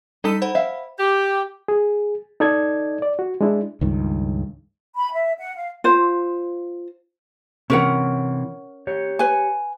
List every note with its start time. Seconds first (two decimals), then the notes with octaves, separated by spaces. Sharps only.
0.24 G3 D#4 A4 B6 D#7
0.42 C5 F#5 B5
0.55 E5 F5
0.99 G4
1.68 G#4
2.40 D#4 A4 D5 D#5 G#6
3.02 D5
3.19 F#4
3.41 G#3 D4 E4
3.81 C#2 G2 D#3
4.97 B5
5.12 E5
5.39 F#5
5.56 F5
5.84 F4 C5
7.70 C3 E3 C#4 A#4 F#5
8.87 G4 C#5
9.19 B4 G#5